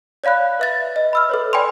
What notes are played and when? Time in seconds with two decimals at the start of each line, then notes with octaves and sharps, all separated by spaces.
0.24 C#5 D5 F5 B5 F#6
0.59 B4 E5 A6
0.96 D#5
1.13 B5 E6 F6
1.29 A4 B4 C#5
1.53 D5 G5 G#5 B5 C6